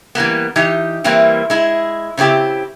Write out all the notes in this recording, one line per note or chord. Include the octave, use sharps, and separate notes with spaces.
E3 G3 A#3 B3
E3 D#4 G4
E3 G3 A#3 C4 E4
G#3 E4
C#3 C4 E4 G4